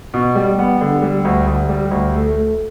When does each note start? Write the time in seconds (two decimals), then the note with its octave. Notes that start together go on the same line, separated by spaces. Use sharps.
0.14 B2
0.35 G3
0.59 B3
0.81 D3
1.02 G3
1.25 D2
1.47 D2
1.69 G3
1.91 D2
2.14 A3
2.36 A3